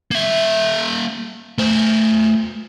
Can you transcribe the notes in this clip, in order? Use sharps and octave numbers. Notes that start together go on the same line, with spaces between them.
A#3 E5
A3 C5